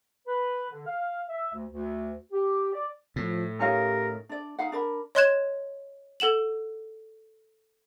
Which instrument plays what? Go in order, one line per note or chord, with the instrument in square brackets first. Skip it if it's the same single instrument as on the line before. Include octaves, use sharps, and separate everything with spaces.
[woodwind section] B4
D3
F5
E5
D2
D2
G4
D5
[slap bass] A2 [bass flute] F3
[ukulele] C#4 D#4 F5 [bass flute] G4 [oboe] A#4
[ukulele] D4 D5
D#4 F5 F#5
D4 A#4 B5
[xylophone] C#5 D#5 C6 F#6 G#6 E7
A4 F#5 E7 F#7